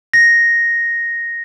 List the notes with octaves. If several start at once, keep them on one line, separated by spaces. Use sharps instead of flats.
A#6